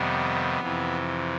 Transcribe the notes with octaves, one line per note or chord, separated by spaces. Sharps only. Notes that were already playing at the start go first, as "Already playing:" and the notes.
Already playing: F2 C3 D#3 G3 B3
F2 C3 E3